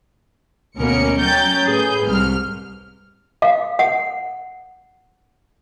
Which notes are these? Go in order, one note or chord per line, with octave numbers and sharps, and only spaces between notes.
D2 B2 A#3 C#4 A#4 C#7
F#3 C#4 G5 A#5 G6 A6
A2 G#4 B4 G6
C2 G#2 F6
F5
F#5